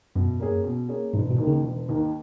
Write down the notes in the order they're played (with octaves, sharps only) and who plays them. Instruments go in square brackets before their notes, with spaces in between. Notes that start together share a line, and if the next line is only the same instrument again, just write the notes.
[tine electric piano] F#2 [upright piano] B2
[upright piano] A#3 C#4 G#4
B2
A#3 C#4 G#4
[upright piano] E1 [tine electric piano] G#2
[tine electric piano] B2
[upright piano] D#2 D#3 A#3
[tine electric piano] C#3
[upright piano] E1
D#2 D#3 A#3